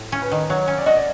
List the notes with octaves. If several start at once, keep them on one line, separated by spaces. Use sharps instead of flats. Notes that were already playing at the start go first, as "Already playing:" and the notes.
Already playing: A2
C#4
B4
D#3
F#3 C#5
C#4
D5
F#4 D#5
D5